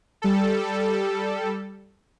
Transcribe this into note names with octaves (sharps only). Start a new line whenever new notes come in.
G3 A4